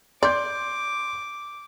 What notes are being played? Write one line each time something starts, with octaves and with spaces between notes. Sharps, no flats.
D5 C6 D6 G6